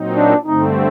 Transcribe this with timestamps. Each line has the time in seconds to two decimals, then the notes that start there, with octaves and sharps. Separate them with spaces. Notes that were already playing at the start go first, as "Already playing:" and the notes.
Already playing: A#2 F#3 C4 D#4
0.16 D4
0.45 G2 D3 A3 C4 D#4